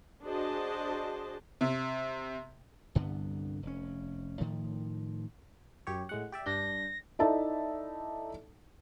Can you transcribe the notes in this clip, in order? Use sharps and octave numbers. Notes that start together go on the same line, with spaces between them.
D4 F#4 G#4 C5 D#5 A5
C3
C2 G2 D3 B3
F1 C#4
A2 D#3 F3
F#2 G4 C#5
A2 G#3 F#5
G4 D5 E5
G2 D4 G6 A#6
D#4 E4 A4 D5 E5 A5